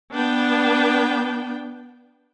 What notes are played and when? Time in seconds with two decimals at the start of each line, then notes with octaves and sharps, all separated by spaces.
0.12 B3 D4 G5